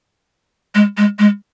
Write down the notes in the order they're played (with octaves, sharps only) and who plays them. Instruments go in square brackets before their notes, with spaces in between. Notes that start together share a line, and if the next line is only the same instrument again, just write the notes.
[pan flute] G#3
G#3
G#3